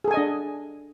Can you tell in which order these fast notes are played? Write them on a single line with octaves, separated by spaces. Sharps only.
G#4 A4 G#5 D#5 D4